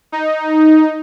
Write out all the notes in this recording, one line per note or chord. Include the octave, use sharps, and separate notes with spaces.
D#4